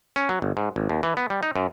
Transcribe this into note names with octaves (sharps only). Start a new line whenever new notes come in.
C#4
F#3
G1
G#2
G#1
D#2
E3
B3
G3
D#4
F#2